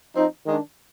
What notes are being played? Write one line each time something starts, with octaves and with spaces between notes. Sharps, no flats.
F3 C4 D#4
D#3 G#3 D4